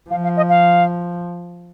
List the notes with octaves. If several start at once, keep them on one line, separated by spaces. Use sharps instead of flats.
F3 F5
F5
D#5
F5